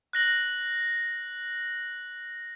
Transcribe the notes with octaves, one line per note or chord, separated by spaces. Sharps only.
F#6 A#6 F#7